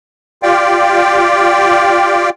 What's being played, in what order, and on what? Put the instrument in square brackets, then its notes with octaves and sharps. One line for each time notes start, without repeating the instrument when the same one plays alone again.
[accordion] F4 G4 D5 F5 G5